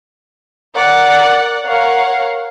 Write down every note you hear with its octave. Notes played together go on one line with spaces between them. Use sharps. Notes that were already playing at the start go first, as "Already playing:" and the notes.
A#4 D5 F#5
A#4 C#5 F5 F#5